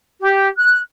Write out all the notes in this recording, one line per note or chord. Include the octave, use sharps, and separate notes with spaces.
G4
F#6